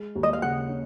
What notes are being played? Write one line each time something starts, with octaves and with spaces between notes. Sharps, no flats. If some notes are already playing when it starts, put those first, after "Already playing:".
Already playing: G#3
D#2
D#5
F5
C#3 F#5
C#4